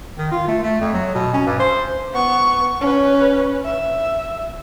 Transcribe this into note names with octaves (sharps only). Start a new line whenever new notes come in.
D#3
F4
A3
A3
F2
F#3
B2
C#4
G2
C5
B3 C#6
C#4 B4
E5